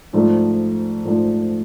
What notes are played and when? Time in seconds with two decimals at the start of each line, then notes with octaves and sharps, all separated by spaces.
0.13 G#2 F3 A3 D4
1.04 G#2 F3 A3 D4